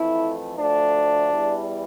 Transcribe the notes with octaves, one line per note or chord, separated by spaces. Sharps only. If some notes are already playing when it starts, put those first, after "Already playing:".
Already playing: F2 E3 A3 E4
D2 D3 F3 A3 D4
E2 E3 G3